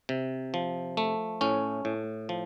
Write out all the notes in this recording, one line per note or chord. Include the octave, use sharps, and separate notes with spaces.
C3
F3
A3
A2 C#4
A2
F3